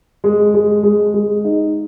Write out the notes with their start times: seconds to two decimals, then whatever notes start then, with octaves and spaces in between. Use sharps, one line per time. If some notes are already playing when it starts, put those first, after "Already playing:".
0.24 G#3
0.54 G#3
0.83 G#3
1.14 G#3
1.44 D#4